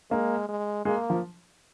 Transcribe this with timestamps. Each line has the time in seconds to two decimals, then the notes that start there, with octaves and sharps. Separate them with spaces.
0.11 G#3 A#3
0.49 G#3
0.85 G#3 A#3
1.10 F3